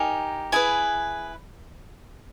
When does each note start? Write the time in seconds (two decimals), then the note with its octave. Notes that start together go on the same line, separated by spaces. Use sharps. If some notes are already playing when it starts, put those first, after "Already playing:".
Already playing: D#4 G4 A#4 G#5
0.52 E4 G#4 B4 G#5